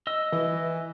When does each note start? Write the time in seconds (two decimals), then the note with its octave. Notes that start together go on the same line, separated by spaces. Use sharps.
0.07 D#5 E6
0.32 E3